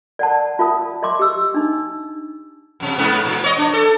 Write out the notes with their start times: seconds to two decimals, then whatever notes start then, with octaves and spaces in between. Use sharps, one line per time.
0.19 D5 F#5 A5
0.59 F4 E5 A5 D#6
1.03 D#5 E5 C6 D6
1.19 G4 E6
1.54 D4 D#4
2.80 F#2 C3
2.98 G#2 B3
3.25 A#2
3.44 C#5 D#5
3.58 D4
3.73 A4